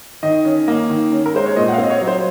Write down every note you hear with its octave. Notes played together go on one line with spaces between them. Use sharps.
D#3 D#5
C#4
A#3
D#3
C#4
A#4
G#3 C5
C#5
A#2 D#5
F#5
F5
C4 D#5
C#5
F#3
C5